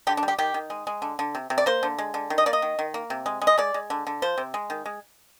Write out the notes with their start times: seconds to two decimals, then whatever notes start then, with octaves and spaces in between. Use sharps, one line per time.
0.07 D3 G4
0.17 D4
0.23 G3
0.28 G4
0.38 D#3 G4
0.54 D#3
0.70 G#3
0.87 G#3
1.02 D3
1.19 D3
1.35 C3
1.50 C3
1.58 D5
1.66 A#3 C5
1.83 D3
1.98 G#3
2.14 D3
2.30 D#3
2.38 D#5
2.46 A#3 D5
2.53 D#5
2.62 D#3
2.79 D#3
2.94 A#3
3.10 C3
3.26 G#3
3.42 G#3
3.47 D#5
3.58 G#3 D5
3.74 G#3
3.90 D3
4.07 D3
4.22 F3 C5
4.38 C3
4.54 G#3
4.70 D#3
4.86 G#3